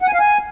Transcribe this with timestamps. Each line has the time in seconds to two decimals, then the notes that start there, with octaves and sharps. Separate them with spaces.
0.02 F#5
0.08 G#5
0.13 F5
0.19 G#5